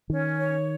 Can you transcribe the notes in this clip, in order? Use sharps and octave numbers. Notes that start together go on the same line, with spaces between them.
D#3 C#4
C#5